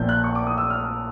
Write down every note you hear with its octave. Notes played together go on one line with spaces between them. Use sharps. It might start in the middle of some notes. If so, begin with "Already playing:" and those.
Already playing: A#1 A#2 F3 A#3 G6
F#6
C#6
D6
D#6
E6
F6